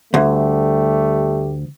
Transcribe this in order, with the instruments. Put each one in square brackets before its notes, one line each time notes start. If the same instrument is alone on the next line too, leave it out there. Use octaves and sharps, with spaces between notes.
[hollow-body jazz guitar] D2 [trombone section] G3 A3 G4